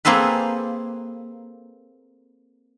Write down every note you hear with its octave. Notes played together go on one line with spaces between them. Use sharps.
A#3 C4 G#4 A4 B4